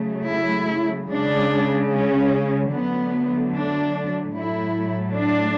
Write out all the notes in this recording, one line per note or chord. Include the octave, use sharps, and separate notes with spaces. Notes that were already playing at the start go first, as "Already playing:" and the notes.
Already playing: C#3 F#3 A3
E4
C#3 G#3 D4
C#4
D3 F#3 A3 B3
D4
A2 F#3 A3 E4
D4